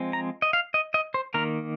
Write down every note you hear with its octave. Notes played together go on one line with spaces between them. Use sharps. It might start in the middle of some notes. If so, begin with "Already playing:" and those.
Already playing: F3 G#3 C4
A#5
D#5
F5
D#5
D#5
C5
D#3 A#3 A#4